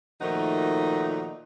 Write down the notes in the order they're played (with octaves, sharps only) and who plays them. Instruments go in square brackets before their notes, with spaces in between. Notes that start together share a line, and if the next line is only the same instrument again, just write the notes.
[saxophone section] A#2 D#3 F3 A3 D#4 F#4